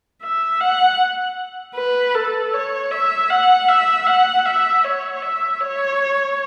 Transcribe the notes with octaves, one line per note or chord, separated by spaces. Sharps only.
E5
F#5
B4
A4
C#5
E5
F#5
E5
F#5
E5
C#5
E5
C#5